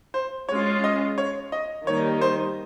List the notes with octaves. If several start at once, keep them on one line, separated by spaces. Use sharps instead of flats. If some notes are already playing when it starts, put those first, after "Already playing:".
C5
G#3 C#4 F4 C#5
D#5
C#5
D#5
D#3 G3 A#3 D#4 C#5
C5